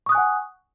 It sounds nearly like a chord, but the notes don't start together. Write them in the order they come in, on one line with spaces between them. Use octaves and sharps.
C#6 D#6 F#6 G#5 F#5